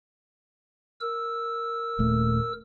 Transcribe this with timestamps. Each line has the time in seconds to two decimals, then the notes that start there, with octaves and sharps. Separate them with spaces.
1.01 A#4 E6
1.99 D#1 A#2 A3